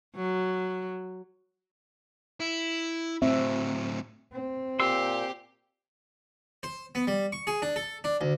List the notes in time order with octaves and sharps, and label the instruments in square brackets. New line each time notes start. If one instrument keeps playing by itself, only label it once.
[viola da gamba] F#3
[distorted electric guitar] E4
[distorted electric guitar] A2 F#3 [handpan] C4 E5
[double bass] C4
[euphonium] A#2 [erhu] G4 [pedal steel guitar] C6 E6
[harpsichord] C5
B3
G3
C#6
G#4
D4
A4
D4
D2